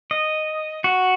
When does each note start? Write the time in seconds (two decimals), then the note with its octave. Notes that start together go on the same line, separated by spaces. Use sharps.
0.11 D#5
0.84 F#4